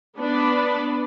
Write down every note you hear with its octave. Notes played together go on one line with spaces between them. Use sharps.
B3 D4 B4 D5